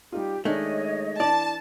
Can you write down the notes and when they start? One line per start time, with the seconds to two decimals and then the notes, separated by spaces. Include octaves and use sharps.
0.12 G3 D#4 F4 G4
0.45 D#3 G#3 A3 D4 C#5 D#5
1.20 E3 D4 D5 A5